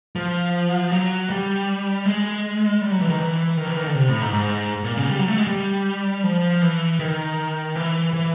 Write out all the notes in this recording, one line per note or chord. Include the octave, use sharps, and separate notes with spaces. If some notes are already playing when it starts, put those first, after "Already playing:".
F3
F#3
G3
G#3
G3
F#3
E3
D#3
E3
D#3
E3
D#3
D3
C3
A2
G#2
G#2
A#2
C#3
G3
F#3
A3
G#3
G3
F3
E3
D#3
E3
E3